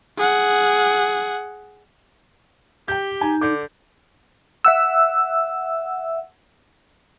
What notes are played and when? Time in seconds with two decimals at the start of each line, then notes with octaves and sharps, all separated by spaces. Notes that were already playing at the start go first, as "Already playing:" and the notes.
0.18 G#4 F#5
2.88 G4 G5 G6
3.21 D#4 G#5 A#5
3.41 D3 D6 G6
4.65 E5 F#5 E6